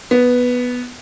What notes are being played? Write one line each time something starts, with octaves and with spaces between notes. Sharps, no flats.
B3